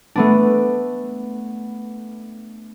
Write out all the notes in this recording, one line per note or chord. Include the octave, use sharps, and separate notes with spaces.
A3 B3 D4